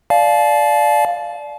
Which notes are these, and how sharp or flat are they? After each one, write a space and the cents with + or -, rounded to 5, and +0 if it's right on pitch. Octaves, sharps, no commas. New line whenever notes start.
D5 +0 F5 +0 A5 -40